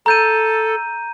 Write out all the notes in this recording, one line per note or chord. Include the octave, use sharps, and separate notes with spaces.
A4 A#5 G6 D#7